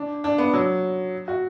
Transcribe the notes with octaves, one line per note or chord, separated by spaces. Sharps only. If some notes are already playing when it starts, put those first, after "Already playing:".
Already playing: D4
D4
B3
F#3
F#4